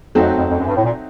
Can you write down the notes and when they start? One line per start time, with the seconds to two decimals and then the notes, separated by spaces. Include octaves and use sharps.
0.15 F2 F#3 A3 C4 D#4 F#4
0.37 F2
0.50 F2
0.58 F#2
0.67 G2
0.76 A2
0.84 A#2